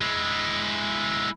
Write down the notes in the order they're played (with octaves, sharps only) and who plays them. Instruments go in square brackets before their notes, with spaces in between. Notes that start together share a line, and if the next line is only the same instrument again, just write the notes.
[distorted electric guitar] G#3 E4